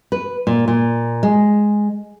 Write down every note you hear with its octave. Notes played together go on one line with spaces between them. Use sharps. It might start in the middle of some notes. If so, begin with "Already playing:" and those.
B4
A#2
A#2
G#3